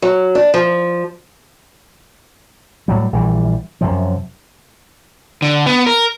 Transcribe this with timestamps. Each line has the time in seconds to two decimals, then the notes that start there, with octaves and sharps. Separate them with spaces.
0.02 F#3
0.35 D4
0.54 F3
2.88 A2 F#3 G3
3.13 A#1 E3 G3
3.81 F#2 C3 F3
5.42 D3
5.66 B3
5.86 A#4